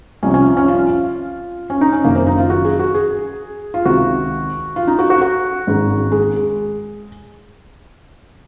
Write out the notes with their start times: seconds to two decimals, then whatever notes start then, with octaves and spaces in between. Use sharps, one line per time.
0.23 C2 C3 F3 C#4
0.34 C#4
0.57 C#4
0.68 F4
1.70 C#4
1.81 D#4
1.93 C#4
2.04 F#1 F#2 D#3 A#3
2.15 C4
2.27 D#4
2.38 F4
2.50 F#4
2.65 G#4
2.79 F#4
2.95 G#4
3.74 F4
3.85 C#2 C3 D#3 F#4
4.76 F4
4.87 D#4
4.99 F#4
5.10 F#4
5.21 F#4
5.67 G#1 G#2 D#3
6.12 G#3